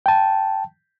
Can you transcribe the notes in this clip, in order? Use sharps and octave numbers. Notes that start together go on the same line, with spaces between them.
G5 A5